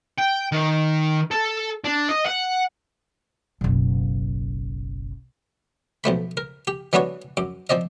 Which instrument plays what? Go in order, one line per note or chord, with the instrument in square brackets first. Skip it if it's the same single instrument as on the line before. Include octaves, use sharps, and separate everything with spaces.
[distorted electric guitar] G5
D#3
A4
D4
D#5
F#5
[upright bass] F#1 B1
[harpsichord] B1 F3 A3 B5
A#4
G4
E3 G3 B3 D4 F#4 C#5
F#2 D6
F3 C4 D5 D#5